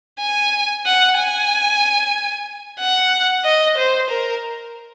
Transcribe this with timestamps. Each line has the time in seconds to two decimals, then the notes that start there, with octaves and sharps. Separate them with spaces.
0.20 G#5
0.86 F#5
1.18 G#5
2.80 F#5
3.45 D#5
3.77 C5
4.10 A#4